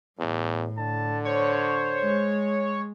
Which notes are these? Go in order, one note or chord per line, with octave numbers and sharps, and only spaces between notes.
E2 A2
D3 A5
C5 C#5
G#3